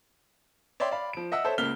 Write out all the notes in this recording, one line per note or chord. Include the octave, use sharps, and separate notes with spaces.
C#5 D5 E5 G5 C6
D5 F5 B5
F3 D7
D#5 E5 F#5 E6
A4 C5 C#5 E5
C#2 A#3 F6 B6 G7